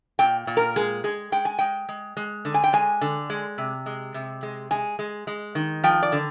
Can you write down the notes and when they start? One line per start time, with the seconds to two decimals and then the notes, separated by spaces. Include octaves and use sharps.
0.19 A#2 G5
0.47 A#2
0.57 A#4
0.76 G#3 G#4
1.04 G#3 G#4
1.32 G#3 G5
1.45 G#5
1.59 G#3 G5
1.89 G#3
2.17 G#3
2.45 D3
2.54 G#5
2.64 G5
2.73 G#3 G#5
3.02 D3
3.30 G#3
3.58 C3
3.86 G#3
4.14 C3
4.43 G#3
4.71 G#3 G#5
4.99 G#3
5.27 G#3
5.55 D#3
5.84 F3 G5
6.03 D5
6.12 D3